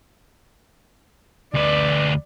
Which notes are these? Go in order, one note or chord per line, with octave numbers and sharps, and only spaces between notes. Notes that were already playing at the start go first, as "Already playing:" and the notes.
D2 B4 D5